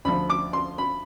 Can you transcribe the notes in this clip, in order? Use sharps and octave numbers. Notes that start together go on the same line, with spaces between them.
D2 D3 F3 B5
D6
C6
B5